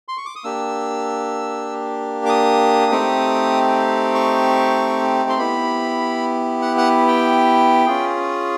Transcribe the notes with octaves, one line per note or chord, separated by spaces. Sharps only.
C6
C#6
D6
D#6
A#3 D4 G4 E6
D6
D#6
A3 C4 D#4 G4
C#6
C6
B3 E4 G4 B5
F#5
F#5
G5
C#4 F4 G#4